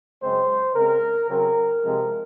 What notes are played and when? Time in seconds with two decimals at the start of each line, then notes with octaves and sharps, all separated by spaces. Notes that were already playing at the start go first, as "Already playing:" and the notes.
0.22 F#2 C#3 G#3 C4 C5
0.75 C#3 G#3 C4 A#4
1.29 C#3 F#3 C4 A#4
1.83 C3 F3 G#3 C4